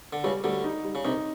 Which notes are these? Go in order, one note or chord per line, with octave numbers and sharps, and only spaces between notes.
D3
C#2 C#3 G3
D2 D3 G3
D#4
G3
C#3
C2 C3 D#4